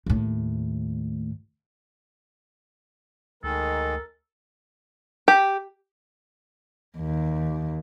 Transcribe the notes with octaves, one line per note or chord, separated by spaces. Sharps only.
D#2 A2
D2 D#3 G#3 A4 A#4
G4
D#2